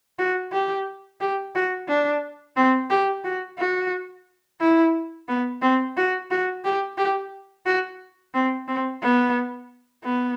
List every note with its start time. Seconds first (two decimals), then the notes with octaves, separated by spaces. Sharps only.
0.19 F#4
0.52 G4
1.21 G4
1.55 F#4
1.88 D4
2.56 C4
2.90 G4
3.24 F#4
3.59 F#4
4.60 E4
5.28 B3
5.62 C4
5.97 F#4
6.31 F#4
6.64 G4
6.98 G4
7.66 F#4
8.34 C4
8.68 C4
9.02 B3
10.04 B3